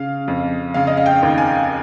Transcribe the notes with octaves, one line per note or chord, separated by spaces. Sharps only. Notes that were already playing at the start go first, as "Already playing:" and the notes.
Already playing: C#3 F5
F2
C#3 F5
D#5
F5
G5
D#2
G#5